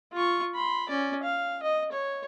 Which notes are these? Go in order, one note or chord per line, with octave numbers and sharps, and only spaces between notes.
F4 C#6
B5 C6
C#4 D5
F5
D#5
C#5